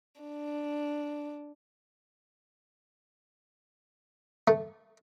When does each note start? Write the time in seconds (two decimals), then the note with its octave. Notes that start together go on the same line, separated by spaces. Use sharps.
0.21 D4
4.48 A3